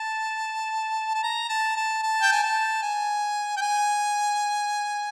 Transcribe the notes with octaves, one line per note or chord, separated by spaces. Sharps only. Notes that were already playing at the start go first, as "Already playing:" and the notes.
Already playing: A5
A5
A#5
A5
A5
A5
G5
G#5
A5
G#5
G5
G#5